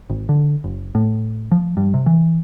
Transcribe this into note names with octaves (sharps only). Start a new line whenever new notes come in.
G#1
D3
F#1
A2
F3
G2
C3
E3